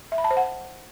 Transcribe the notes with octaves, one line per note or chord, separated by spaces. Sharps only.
E5
B5
A5
C5
F#5